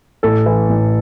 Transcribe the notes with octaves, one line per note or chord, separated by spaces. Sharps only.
A1 A4
E3
A1